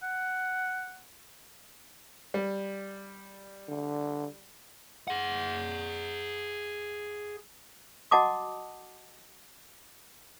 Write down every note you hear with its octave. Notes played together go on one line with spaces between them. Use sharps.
F#5
G3
D3
G#4 F#5
F#4 D#5 F#5 A5 D6 D#6